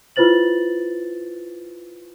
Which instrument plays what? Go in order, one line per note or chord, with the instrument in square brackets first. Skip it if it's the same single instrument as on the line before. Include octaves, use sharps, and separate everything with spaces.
[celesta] E4 F4 B4 C5 A6 F#7